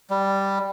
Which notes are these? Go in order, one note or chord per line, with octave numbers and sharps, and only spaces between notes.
G3